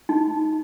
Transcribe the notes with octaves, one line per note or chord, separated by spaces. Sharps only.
D#4